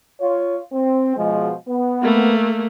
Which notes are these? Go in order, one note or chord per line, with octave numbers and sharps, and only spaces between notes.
F4 C#5
C4
B2 F3 G#3
B3
A3 A#3